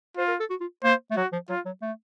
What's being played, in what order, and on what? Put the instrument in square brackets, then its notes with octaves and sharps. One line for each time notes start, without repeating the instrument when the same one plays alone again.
[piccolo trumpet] F4 [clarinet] C5
[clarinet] A#4
A4
F#4
F4
[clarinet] A#3 [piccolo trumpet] C5
[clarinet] A3
[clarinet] F#3 [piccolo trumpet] F#4
[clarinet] F3
[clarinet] F#3 [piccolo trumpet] F4
[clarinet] F#3
A3